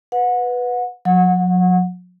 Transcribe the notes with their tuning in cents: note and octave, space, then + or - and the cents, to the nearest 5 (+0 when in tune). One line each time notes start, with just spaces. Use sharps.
B4 +0 F#5 -30
F#3 -40 F#5 -20